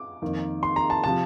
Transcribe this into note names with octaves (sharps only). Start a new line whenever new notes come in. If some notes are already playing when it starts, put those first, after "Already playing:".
Already playing: D6
F2 D#3 A#3
C6
A#5
A5
C3 F3 A5